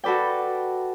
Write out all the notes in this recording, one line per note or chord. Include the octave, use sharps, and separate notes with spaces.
F#4 A4 B4 D5 G5